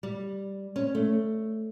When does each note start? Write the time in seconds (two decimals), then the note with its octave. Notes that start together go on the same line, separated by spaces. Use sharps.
0.03 G3
0.76 C#4
0.95 A3